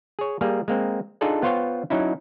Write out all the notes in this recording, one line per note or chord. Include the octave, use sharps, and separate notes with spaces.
G#4 C#5
G3 A#3 G#4
G#3 A#3 C4
D4 D#4 F4 G#4 A4 D5
B3 F4 C5 C#5 F5 G5
F#3 C#4 D#4 E4